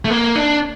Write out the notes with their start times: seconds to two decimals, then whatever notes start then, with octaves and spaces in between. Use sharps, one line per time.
0.05 A3
0.10 A#3
0.35 D4